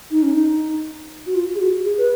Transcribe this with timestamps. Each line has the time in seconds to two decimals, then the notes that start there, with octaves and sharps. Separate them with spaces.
0.11 D#4
0.23 C#4
0.33 D#4
1.26 F#4
1.35 F4
1.55 G#4
1.59 F#4
1.84 G#4
1.98 B4